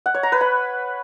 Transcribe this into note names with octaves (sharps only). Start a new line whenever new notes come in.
F#5
C#5
A#5
B4
B5